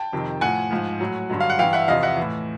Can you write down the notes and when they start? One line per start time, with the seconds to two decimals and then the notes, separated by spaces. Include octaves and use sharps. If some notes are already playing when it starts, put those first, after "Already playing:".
Already playing: G5 A5
0.13 F2 C3 D#3
0.41 A2 F3 F#5 G#5
0.71 G#2 F3
1.00 A2 F#3
1.30 G2 D3 F#3
1.40 F5
1.50 F#5
1.59 G2 E3 F5 G5
1.73 E5 F#5
1.88 E2 C3 F3 D#5 F5
2.03 E5 F#5
2.17 E3
2.22 A2